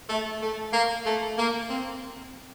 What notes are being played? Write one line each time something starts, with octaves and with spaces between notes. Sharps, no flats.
A3
A3
A#3
A3
A#3
C4